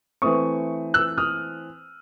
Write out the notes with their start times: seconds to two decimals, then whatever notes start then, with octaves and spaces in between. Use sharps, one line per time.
0.22 E3 A3 C4 C#6 D#6
0.94 E6 F#6
1.18 D#6 F6